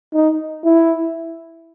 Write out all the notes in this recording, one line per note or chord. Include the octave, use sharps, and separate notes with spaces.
D#4
E4